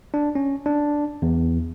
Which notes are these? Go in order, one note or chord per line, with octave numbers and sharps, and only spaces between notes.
D4
C#4
D4
E2